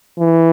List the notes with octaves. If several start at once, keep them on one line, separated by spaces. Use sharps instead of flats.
E3